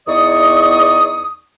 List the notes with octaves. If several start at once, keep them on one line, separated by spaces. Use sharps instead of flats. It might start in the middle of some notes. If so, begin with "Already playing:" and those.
E2 D#4 D5 C#6 D#6